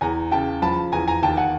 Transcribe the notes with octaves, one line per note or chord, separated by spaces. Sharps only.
E2 G#5 A#5
C#3 G5 A5
F3 A5 B5
E2 G#5 A#5
G#5 A#5
D#2 G5 A5
F#5 G#5